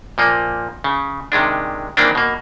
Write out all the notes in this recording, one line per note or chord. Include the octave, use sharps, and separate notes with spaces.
A#2 F3 A#3
C#3
C3 D#3 G#3 D4
D#3 E3 A#3 C4 D4
B2 A#3